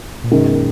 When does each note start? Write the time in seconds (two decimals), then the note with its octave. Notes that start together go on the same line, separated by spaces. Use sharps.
0.24 A#2
0.31 F#2 B2 D#3 G#3
0.56 A#2